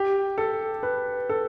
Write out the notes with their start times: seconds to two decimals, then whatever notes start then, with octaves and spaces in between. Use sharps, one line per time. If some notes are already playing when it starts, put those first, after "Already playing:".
Already playing: G4
0.38 A4
0.83 B4
1.29 A4